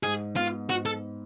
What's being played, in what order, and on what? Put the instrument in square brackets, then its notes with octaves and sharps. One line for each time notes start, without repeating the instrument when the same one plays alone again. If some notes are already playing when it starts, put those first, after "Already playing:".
[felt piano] G#2 [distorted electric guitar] G#4
[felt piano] B3 [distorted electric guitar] F4
[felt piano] G#2 [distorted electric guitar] F#4
[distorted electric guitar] A4